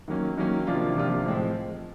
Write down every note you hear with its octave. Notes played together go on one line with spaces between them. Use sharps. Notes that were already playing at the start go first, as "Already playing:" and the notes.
D#3 F#3 A#3 C#4
D#3 F#3 A#3 C#4
C3 F3 A#3 D4 F4
C3 F3 A#3 D4 F4
A2 F3 G#3 C4